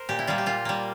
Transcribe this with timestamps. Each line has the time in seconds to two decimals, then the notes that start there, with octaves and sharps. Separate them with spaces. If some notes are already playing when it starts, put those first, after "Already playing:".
Already playing: A#4 C5
0.09 A#2 G4
0.19 E4
0.27 G3 A#3 F4
0.38 G4
0.46 A#2 F4
0.65 G3 A#3